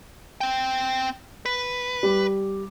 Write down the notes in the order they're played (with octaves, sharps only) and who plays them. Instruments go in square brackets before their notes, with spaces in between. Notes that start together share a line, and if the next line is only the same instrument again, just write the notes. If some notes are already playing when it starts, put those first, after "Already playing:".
[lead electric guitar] C4 G5
B4
[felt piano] G3